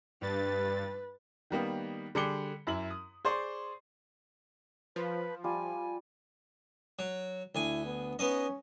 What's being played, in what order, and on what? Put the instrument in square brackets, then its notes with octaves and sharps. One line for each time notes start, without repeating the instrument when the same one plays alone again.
[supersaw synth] G2 A6 [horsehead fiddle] B4
[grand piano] D#3 G3 A#3 B3
D3 G3 G#4 D6 C#7 G7
F#2 E4 F#7
D#6
G#4 C5 D5 C6 C#6
[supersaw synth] F3 [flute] B4
[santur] G3 F4 A5 [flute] G#5
[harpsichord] F#3
[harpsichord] D2 G#5 [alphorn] E4
[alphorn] B3
[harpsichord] B3 D#4 D#5 [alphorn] C#4